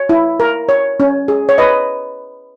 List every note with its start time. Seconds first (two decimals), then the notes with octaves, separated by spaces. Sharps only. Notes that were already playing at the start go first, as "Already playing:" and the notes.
Already playing: C#5
0.09 E4
0.40 A#4
0.69 C#5
1.00 C#4
1.28 G#4
1.49 C#5
1.58 B4 D#5